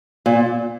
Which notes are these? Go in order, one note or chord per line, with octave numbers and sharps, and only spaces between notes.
A#2